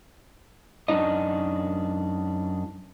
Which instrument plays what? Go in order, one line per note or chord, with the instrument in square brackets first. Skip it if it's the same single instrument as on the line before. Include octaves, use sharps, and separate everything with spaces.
[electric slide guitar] F#2 G#3 D4 D#4 D#5